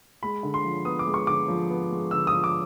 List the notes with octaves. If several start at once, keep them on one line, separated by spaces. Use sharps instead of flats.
G#3 B5
D3
C6
F3
B3 D#6
D6
G#3
C#6
D3 D6
F3
B3
G#3
D3 E6
F3 D#6
D6